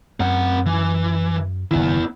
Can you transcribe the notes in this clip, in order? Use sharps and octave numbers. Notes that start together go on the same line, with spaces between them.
F#2 C4 F#5
E3
F#1 D#3 B3 E4